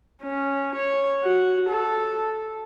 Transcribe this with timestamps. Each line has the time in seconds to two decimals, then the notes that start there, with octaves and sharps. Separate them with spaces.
0.22 C#4
0.75 C#5
1.24 F#4
1.69 A4